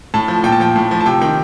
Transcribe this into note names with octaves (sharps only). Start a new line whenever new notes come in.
A2 A5
F3
A#2 G5
A5
F3 G5
A2
F3
A5
C3 G5
D#3 G5